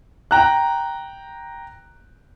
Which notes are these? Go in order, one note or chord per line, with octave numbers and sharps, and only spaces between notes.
G5 A#5 F#6